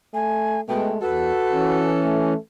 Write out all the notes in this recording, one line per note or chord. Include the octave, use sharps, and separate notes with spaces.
A3 G#5
B2 G#3 A3 G5
E2 F#4 A4 B4
E3 C#4
A3